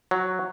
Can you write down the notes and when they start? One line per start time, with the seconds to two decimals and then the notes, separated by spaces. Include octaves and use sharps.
0.11 F#3